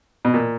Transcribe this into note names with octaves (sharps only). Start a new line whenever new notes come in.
B2
A#2